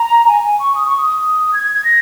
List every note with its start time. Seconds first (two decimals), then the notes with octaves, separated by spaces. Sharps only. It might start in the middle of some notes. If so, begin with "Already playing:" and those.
Already playing: A#5
0.28 G#5
0.44 G#5
0.60 C#6
0.75 D#6
0.86 C#6
0.97 D#6
1.54 G#6
1.64 G#6
1.74 G#6
1.84 A#6